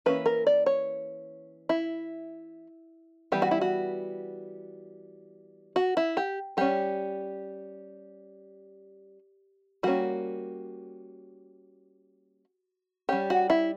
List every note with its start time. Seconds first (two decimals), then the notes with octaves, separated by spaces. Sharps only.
0.06 E3 A#3 C#4 B4
0.26 A#4
0.47 D5
0.66 C#5
1.69 E4
3.32 E3 G3 B3 G4
3.42 F#4
3.51 E4
3.61 F#4
5.76 F#4
5.97 E4
6.17 G4
6.57 G3 C#4 G4
9.83 G3 A#3 C#4 F#4
13.09 G3 C#4 G4
13.30 F#4
13.50 E4